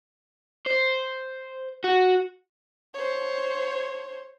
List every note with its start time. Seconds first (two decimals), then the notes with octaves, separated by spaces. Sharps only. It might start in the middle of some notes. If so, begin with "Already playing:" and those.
0.66 C5
1.84 F#4
2.94 C5 C#5